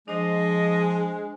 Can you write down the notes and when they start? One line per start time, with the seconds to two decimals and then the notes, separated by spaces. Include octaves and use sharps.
0.08 F3 G#3 D4 C5 D#5